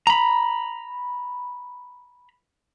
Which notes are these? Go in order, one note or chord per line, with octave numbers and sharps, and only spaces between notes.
A#5 B5